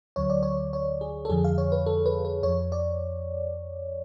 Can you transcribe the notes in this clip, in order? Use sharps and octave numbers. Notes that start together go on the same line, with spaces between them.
D2 D3 F#3 C#5
D5
C#5
C#5
G#4
A4
F2 D3 F3 G#4
F5
C#5
B4
A4
B4
B4
F2 F3 C#5
D5